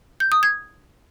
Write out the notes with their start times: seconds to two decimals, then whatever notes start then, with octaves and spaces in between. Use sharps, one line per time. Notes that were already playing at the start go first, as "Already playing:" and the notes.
0.20 G6
0.32 D#6
0.43 G#6